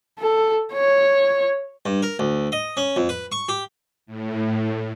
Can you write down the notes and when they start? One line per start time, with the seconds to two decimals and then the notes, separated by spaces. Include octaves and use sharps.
0.19 A4
0.73 C#5
1.86 G2
2.03 A#4
2.19 D2
2.52 D#5
2.77 C#4
2.96 F2
3.09 B4
3.32 C#6
3.49 G4
4.06 A2